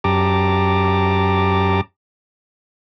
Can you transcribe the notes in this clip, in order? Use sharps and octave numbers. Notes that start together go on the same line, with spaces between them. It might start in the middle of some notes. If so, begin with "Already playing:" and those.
F#2 G4 A5 A#5 D6